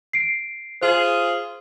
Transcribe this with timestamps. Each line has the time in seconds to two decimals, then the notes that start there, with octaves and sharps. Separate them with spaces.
0.13 C7 D7
0.81 F4 G#4 C5